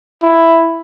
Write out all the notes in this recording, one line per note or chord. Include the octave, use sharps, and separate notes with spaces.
E4